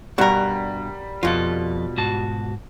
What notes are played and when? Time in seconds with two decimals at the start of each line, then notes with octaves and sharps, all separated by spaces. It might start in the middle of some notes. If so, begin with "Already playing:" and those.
0.18 G2 B2 G3 F#4 A#4
1.23 F2 B2 F4 A4
1.97 G#2 F#4 A5